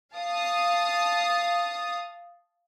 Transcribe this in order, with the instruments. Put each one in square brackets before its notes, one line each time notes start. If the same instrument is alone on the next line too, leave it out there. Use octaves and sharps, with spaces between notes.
[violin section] F5 A5 D#6